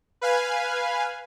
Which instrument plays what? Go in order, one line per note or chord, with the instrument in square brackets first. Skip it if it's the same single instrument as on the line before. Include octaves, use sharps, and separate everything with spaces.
[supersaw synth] B4 F5 G#5